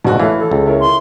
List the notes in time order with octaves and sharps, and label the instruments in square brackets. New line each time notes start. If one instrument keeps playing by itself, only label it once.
[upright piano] A#1 F#4 [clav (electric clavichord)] G#2 B2
[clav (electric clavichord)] E3 [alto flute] A3 [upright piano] C#5 F5
[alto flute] A4
[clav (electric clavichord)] C#2
[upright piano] E4 A#4 C#5
[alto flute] C6